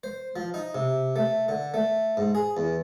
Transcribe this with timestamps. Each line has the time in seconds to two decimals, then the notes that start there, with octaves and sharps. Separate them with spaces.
0.04 C5
0.36 F3
0.54 D#4
0.75 C3
1.16 A3
1.48 D3
1.74 A3
2.17 G#2
2.35 G#4
2.57 E2